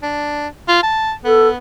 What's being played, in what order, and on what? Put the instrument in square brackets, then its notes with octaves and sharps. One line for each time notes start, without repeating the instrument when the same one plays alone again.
[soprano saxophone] D4
F4
A5
[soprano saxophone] B3 [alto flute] A4